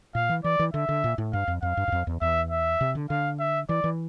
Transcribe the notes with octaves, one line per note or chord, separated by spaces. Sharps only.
A#2 F5
E3
E3 D5
E3
D3 E5
D3
A#2
A2
G2 F5
F2
F2 F5
G2
G2
F2
E2
E2 E5
E5
C3
D3
D3 F5
E5
E3 D5
E3